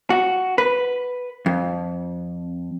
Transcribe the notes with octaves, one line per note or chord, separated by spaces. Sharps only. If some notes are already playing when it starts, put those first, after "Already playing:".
F#4
B4
F2